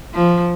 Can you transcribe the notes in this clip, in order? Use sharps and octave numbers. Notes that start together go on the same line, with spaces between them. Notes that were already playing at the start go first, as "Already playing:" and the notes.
F3